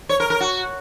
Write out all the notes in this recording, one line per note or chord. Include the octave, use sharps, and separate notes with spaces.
C#5
A#4
A#4
F#4